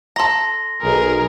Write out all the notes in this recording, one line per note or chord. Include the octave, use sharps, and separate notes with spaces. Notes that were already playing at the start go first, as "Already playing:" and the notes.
A4 A#5 C6 A#6
B1 G#4 A#4